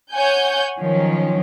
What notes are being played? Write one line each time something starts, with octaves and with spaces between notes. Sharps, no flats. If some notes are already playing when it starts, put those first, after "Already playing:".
C#5 F#5 G#5 G6
D#3 F3 F#3 C#4